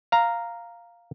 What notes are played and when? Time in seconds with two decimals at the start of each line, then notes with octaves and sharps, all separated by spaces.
0.12 F5 A#5